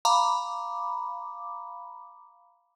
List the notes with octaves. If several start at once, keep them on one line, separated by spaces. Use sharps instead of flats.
F5 A#5 B5 D6